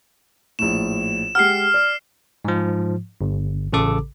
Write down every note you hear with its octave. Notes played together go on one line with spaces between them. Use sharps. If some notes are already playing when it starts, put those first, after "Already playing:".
A#1 A2 E7
G#3 G4 F#5 F6 C7
D5
G#2 F3
G1
A1 C#3 A4 D6